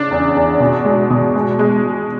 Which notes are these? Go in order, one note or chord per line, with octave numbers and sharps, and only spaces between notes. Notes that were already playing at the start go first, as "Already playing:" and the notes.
Already playing: C#3 D4
E2
E2
B2
G#3
B2
G#3
G#3